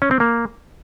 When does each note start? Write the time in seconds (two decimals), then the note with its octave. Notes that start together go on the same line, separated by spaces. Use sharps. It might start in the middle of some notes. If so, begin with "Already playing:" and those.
0.02 C#4
0.11 C4
0.20 A#3